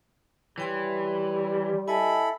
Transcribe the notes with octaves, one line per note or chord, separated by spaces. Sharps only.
E3 G3 C#5 G5 C6
E4 A4 D#5 G#5 B5